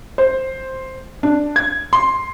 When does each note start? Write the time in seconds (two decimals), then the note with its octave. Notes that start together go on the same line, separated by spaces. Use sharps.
0.18 C5
1.23 D4
1.56 G#6
1.93 C6